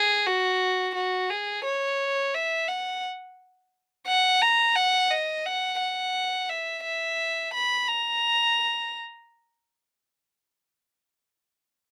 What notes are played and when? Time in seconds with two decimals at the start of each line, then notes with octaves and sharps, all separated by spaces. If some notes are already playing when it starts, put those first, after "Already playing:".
Already playing: G#4
0.26 F#4
0.95 F#4
1.30 G#4
1.65 C#5
2.34 E5
2.68 F#5
4.07 F#5
4.42 A#5
4.76 F#5
5.11 D#5
5.46 F#5
5.80 F#5
6.49 E5
6.84 E5
7.53 B5
7.88 A#5